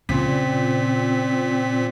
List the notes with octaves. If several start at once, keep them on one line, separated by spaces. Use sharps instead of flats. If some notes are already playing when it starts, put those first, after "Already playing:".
A#2 C#3 C4 B6